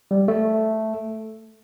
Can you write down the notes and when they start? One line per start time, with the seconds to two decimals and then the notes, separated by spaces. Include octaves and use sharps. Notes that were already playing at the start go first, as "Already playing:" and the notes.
0.11 G3
0.28 A3